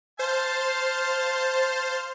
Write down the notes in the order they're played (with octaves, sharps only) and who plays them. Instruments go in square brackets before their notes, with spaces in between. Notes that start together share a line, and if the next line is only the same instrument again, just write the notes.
[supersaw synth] C5 [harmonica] F5 A5